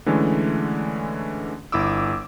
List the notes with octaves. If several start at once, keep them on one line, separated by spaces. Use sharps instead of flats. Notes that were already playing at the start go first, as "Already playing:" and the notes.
D3 E3 G#3 A3 C#4
G1 E4 D6 E6